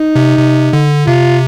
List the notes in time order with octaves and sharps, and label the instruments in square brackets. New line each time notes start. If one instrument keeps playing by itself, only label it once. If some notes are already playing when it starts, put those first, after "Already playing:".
Already playing: [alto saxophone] D#4
[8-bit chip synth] C3
C3
D3
[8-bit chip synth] C3 [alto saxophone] F4